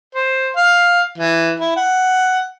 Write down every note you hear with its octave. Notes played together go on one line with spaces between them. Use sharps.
C5
F5
E3
E4
F#5